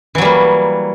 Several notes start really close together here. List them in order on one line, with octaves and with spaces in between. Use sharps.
E3 F#3 G3 A#3